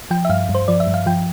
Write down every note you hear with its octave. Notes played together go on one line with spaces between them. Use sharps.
F3 G5
E5
G2 F5
G2
C5
F3 D5
E5
G2
F5
F3 G5